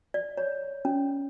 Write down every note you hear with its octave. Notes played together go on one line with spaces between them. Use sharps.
D5
C#5
C#4